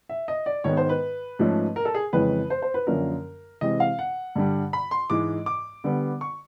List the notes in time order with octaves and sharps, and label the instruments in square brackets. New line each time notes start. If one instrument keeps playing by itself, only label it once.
[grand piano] E5
D#5
D5
G#2 D#3 G#3 B3 C#5
C5
B4
G#2 F3 A3 C#4
A#4
A4
G#4
F2 C#3 E3 G#3 C#4 B4
C5
C5
B4
F#2 D3 F3 A#3 C#4 A#4
C3 E3 G#3 C4 D#5
F5
F#5
G2 D3 G3
B5
C6
G#2 E3 G#3 D6
D6
D3 G3 B3
C#6